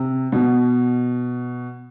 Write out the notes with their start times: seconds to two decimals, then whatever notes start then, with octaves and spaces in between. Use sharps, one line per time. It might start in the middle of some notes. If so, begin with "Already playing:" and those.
Already playing: C3
0.32 B2